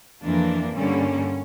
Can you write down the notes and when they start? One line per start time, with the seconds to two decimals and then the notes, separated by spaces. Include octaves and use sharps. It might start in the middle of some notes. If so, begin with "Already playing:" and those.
0.22 F2 E3 A#3 D4
0.76 G2 D3 G3 A#3 C#4